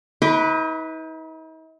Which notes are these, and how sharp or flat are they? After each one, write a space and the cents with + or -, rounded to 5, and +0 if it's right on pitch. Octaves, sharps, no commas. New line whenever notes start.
D#4 +45 B4 +0 D6 -15